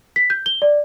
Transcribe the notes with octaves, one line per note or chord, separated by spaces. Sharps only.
B6
G6
G7
D5